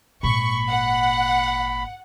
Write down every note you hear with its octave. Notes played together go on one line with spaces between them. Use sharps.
G#1 A#2 B5 C#6
F#5